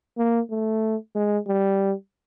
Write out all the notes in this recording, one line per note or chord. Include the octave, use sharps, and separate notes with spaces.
A#3
A3
G#3
G3